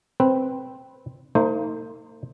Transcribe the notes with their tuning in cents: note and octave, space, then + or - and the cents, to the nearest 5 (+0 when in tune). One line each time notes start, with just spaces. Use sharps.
C4 +0 B4 +0
A#3 -45 D#4 +25 C5 +0